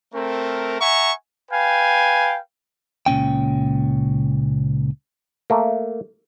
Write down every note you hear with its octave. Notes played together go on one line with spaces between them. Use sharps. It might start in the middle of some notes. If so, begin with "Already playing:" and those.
A3 C4 A#4
E5 F#5 G#5 A#5 C#6
B4 F5 G5 G#5
C#2 A#2 C#4 G5
A3 A#3